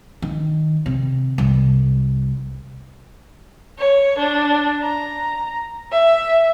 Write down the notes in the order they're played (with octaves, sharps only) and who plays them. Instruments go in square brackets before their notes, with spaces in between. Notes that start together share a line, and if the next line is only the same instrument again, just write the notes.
[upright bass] D#3
C3
C2
[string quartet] C#5
D4
A#5
E5